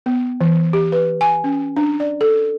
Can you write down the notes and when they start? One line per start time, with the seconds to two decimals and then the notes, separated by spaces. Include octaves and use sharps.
0.06 B3
0.41 E3
0.73 G4
0.92 B4
1.21 G#5
1.44 C#4
1.76 D4
2.00 D5
2.21 A4